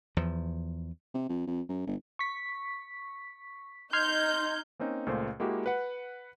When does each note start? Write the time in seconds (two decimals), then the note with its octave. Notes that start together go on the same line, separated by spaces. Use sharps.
0.17 E2 F3
1.14 C3
1.29 F2
1.47 F2
1.69 F#2
1.87 G1
2.19 C#6 B6
3.93 D#4 C6 F6 G6 G#6
4.79 A#3 C4 C#4 D#4
5.06 C#2 A#2 A3 C5
5.40 G#3 A#3 E4 F#4 G4
5.66 B4 F#5